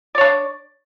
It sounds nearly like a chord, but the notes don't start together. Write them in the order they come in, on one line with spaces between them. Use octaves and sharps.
D5 C#5 D4